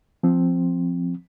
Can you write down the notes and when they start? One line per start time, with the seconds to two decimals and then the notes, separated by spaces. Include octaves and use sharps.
0.23 F3 C4